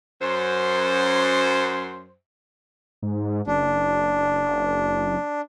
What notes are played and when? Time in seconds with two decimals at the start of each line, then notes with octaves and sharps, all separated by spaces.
0.21 F#2 C5
3.03 G#2
3.47 F#1 D4